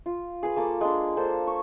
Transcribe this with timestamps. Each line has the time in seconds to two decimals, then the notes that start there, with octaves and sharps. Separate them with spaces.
0.06 F4
0.43 G#4 B4
0.56 A#3 A4 D6
0.81 G#3 D4
1.17 A#3 D4 A4 C5
1.47 C#6